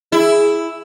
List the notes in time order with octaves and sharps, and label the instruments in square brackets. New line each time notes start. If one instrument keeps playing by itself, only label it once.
[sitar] E4 [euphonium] G#4